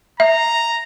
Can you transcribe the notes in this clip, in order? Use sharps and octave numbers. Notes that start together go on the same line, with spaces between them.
E5 A#5